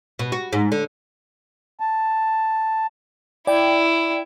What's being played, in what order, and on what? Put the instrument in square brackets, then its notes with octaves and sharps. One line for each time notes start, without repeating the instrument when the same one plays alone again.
[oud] B2
F#4
G#2
D3
[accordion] A5
[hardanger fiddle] E4 [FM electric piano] D5 G5